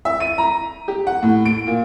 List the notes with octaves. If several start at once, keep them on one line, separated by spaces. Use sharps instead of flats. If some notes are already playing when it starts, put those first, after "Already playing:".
E5
D#7
A#5
G4
F#5
A2
D7
A#2